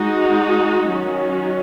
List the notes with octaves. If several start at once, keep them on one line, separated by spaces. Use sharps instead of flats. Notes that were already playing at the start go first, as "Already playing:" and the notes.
Already playing: G#3 D#4 F#4
D#3 F#3 C#4 F#4